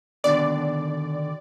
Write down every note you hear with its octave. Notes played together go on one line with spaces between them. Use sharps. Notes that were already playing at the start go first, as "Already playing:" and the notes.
D#2 B2 D3 D5